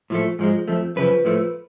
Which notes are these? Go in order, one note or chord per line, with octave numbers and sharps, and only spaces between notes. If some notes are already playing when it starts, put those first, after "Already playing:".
A2 F3 A3
G#2 F3 G#3
F2 F3 A3
F#2 C#3 F3 B4
A2 F3 A3